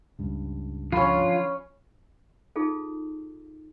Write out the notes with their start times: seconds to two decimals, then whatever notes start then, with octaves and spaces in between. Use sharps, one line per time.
0.19 C#2 G2
0.92 D3 F3 C#4 F4 B5
2.56 D#4 F4 G#4 A4